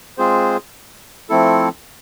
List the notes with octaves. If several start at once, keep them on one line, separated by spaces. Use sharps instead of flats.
G#3 C4 F4 G#4 C5
F3 A3 C4 E4 A4